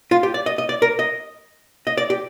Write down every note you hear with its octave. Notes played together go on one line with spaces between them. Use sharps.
F4
G4
D5
D#5
D#5
D5
A#4
D#5
D#5
D5
G4